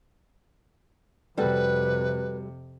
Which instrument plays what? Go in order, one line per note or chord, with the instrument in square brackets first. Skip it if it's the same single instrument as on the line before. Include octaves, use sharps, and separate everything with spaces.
[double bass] F2 C3 [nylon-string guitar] G3 F#4 A4 [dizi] B4